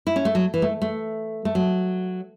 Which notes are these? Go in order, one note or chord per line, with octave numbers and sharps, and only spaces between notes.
E4
C#4
A3
F#3
E3
A3
A3
A3
F#3